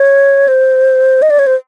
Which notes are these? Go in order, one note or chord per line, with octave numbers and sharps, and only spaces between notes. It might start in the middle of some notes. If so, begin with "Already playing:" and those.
Already playing: C#5
C5
D#5
D5
C#5
C5